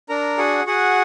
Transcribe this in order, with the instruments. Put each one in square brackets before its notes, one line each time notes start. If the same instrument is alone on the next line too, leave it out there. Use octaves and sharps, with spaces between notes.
[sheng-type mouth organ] D4 A#4 A#5
F#4 G#4 F#5
F#4 G#4 F#5